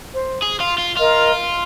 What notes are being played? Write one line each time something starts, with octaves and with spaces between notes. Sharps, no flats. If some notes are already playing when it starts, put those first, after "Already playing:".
C5
G#4
F4
F4
F4 A#4 D#5